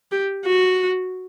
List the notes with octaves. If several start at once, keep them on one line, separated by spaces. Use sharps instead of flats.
G4
F#4